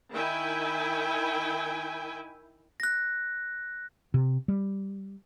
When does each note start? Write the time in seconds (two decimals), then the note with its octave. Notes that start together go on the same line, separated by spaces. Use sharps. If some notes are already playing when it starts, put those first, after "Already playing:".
0.11 D#3 E4 E5 G5 G#5
2.80 F#6 A#6
4.14 C3
4.48 G3